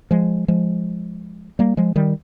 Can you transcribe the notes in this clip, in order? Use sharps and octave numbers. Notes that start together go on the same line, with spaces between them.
F3 G#3
F3 G#3
G3 A#3
F3 G#3
D#3 G3